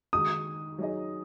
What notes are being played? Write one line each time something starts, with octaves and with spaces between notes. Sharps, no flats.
D#3 G#3 D#4 F#4 D#6
F#3 D#4 G#4 D#5